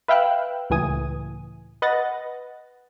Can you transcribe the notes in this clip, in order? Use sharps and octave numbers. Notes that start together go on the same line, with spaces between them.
B4 E5 F5 G5 E6 F#6
C#2 A2 E3 G#5 D#6
B4 D#5 F#5 F#6 A6 A#6